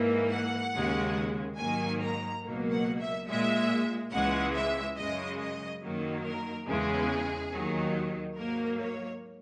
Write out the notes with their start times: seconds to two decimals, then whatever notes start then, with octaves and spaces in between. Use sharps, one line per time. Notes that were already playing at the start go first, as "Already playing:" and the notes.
Already playing: G#2 E3 A#3
0.31 F#5
0.73 D#2 C#3 G#3
1.58 G#2 D#3 F#3 A#3 G#5
2.01 A#5
2.43 C#2 B2 F#3 A#3
2.71 F#5
3.00 E5
3.28 A#2 G#3 E5
4.12 C#2 C#3 E3 G#3 F#5
4.55 E5
4.97 F#2 C#3 G#3 D#5
5.39 D#5
5.82 F#2 D#3 F#3 A#3
6.25 A#4
6.66 E2 C#3 G#3 G#4
7.52 D#2 D#3 F#3
8.36 G#2 F#3 A#3 A#4
8.78 C#5